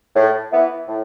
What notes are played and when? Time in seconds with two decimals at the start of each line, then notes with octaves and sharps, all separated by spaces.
0.16 A2
0.52 E3 B3 E4
0.88 A2